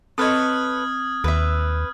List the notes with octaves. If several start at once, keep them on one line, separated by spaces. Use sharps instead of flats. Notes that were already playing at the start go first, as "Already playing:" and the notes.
C4 A4 B4 C#5 D#5 D#6 F6 G#6
D#2 B4 E5